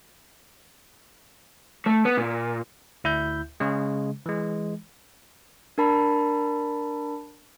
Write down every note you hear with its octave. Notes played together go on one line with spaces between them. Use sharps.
A3
B3
A#2
D2 E4 E5 G6
C#3 G#3
E3 G#3
D4 A#4 A5 B5